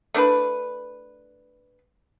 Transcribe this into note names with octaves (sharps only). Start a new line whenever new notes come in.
A3 D4 E4 B4